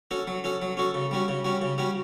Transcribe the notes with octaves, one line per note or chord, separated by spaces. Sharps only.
C#4 F#4 A4
F#3
C#4 F#4 A4
F#3
C#4 F#4 A4
C#3
G3 C#4 F#4
C#3
G3 C#4 F#4
C#3
G3 C#4 F#4